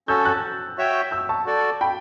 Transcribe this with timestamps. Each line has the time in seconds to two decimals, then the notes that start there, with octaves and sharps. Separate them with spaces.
0.08 C#4 F#4 A4 E6 G6
0.25 F#6 A6
0.78 F#4 C#5 E5 G5
1.11 E6 G6
1.29 A5 C#6
1.46 F#4 A4 D5
1.81 G5 B5